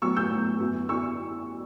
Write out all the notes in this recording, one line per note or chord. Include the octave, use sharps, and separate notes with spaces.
A2 F#3 B3 C#6 E6
E6 G6
A2 F#3 B3
F#2 E3 B3
E3 B3 C#6 E6